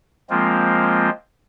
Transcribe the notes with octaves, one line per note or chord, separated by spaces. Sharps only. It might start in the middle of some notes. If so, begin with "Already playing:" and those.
F3 G#3 A#3 C4 F4